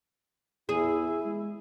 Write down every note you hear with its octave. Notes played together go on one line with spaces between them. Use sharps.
E2 E4 G#4
G#3